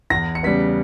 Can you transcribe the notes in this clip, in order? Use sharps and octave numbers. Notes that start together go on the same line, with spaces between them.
E2 A#6
C#7
C#3 G3 B3 B6